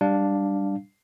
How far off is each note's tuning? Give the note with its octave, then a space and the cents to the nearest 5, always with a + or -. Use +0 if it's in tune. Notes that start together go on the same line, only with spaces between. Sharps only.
G3 +0 D4 +0 F5 +0